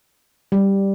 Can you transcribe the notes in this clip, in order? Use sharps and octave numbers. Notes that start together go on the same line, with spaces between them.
G3